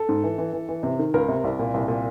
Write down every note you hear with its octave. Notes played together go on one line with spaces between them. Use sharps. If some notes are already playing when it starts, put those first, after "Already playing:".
Already playing: A4
G#2
E3
E3
E3
E3
C3
D#3
C#2 A#4
C3
C2
A#2
C2
A#2